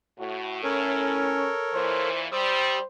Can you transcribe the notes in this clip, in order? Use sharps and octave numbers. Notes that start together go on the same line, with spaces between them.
A2 F#4
C#4 A4 A#4 C#5
A#2 E3 C5
G3 C5 D#6 E6